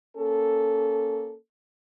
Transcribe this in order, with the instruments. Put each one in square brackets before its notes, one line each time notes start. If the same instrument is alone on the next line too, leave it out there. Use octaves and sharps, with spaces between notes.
[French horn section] A#3 C#4 A4